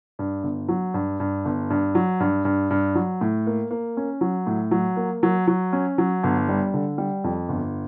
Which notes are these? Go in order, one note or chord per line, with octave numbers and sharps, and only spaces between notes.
G2
G1
F#3
G2
G2
G1
G2
F#3
G2
G2
G2
F#3
A2
A#3
A#3
C#4
F#3
A2
F#3
A#3
F#3
F#3
C#4
F#3
G1
G3
D3
G3
F2
G1